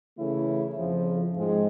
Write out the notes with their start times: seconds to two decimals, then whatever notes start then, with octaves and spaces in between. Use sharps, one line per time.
0.16 C#3 E3 A3 C#4 E4
0.75 F2 C#3 F3
1.34 G#2 F3 G#3 C4